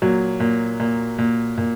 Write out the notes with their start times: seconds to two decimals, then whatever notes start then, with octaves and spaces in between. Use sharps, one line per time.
0.02 A#2 F#3
0.40 A#2
0.80 A#2
1.19 A#2
1.58 A#2